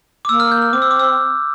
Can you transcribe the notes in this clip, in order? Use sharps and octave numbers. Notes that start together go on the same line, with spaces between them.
D6
A#3 E6
F6
G6
F6
C4 D6
E6
D6
E6